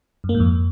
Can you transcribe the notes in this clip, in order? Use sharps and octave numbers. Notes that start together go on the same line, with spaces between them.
F#2
A#3
G#2
F2